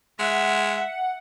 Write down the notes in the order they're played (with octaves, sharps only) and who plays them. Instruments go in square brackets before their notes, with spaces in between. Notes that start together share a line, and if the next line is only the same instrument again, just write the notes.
[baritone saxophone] G#3 [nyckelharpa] E5 [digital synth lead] F#5